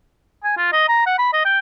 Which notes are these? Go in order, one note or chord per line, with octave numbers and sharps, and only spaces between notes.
G#5
F4
D#5
A#5
F#5
B5
D#5
G5